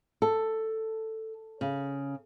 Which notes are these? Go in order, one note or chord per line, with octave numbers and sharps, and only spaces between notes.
A4
C#3